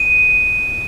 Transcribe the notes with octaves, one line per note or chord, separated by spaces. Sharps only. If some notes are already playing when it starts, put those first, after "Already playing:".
Already playing: D#7